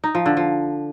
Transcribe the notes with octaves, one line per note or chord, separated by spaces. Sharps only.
D#4
F3
D3
F3